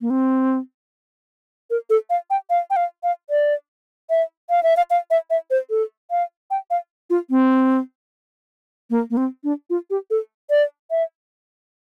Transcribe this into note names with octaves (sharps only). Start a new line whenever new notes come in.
A#3
C4
A#4
A4
F5
G5
F5
G5
F5
F5
D5
E5
F5
E5
F5
F5
E5
E5
C5
A4
F5
G5
F5
F4
C4
A#3
A#3
C4
D4
F4
G4
A4
D5
E5